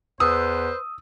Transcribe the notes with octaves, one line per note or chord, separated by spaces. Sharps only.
E2 B4 C5 D#6 E6